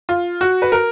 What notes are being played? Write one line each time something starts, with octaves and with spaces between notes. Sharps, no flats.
F4
F#4
B4
A#4